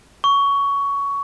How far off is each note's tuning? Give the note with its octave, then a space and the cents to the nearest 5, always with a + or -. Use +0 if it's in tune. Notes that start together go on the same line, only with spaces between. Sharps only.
C#6 +15